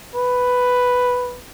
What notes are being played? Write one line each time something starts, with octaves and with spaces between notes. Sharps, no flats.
B4